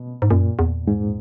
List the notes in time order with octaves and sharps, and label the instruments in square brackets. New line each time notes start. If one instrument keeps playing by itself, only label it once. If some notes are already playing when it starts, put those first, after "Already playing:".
Already playing: [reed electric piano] B2
[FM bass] G#2
[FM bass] F#2 [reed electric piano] A#2
[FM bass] E2
[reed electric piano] G#2